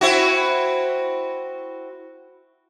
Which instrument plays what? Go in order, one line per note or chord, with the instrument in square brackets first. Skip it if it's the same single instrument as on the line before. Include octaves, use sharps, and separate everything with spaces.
[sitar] C4 E4 F#4